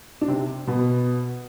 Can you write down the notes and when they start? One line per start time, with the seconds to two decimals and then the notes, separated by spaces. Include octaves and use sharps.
0.21 D4
0.28 C3 C4
0.67 B2 B3